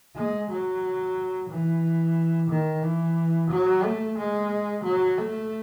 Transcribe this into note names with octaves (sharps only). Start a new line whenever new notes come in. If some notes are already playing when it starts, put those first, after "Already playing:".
G#3
F#3
E3
D#3
E3
F#3
A3
G#3
F#3
A3